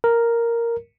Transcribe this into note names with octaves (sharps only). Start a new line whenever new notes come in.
A#4